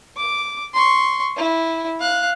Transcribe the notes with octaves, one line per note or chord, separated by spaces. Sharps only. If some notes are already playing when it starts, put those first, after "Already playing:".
D6
C6 C#6
E4
F5 F#6